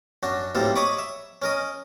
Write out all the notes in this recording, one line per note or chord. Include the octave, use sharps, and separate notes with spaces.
F#2 D4 F#4
B1 A2 G3 A#3 C4 A4
C#5 D#5 A#5 B5 C#6 D6
E5
C#4 A#4 D#5